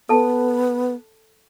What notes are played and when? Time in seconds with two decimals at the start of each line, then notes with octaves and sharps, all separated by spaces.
0.09 B3 A4 A5